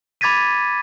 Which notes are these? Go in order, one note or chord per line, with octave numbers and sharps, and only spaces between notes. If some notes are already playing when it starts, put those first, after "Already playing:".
B5 D6 G#6 A6 B6 D#7